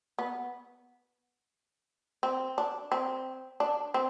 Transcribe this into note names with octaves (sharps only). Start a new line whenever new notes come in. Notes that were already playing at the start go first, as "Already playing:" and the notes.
B3
C4
D4
C4
D4
C4